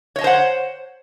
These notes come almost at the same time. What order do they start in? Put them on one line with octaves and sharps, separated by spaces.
C#5 D#5 A5 C5 F#5